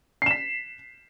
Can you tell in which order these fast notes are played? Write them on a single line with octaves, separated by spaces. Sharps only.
C7 E7 B6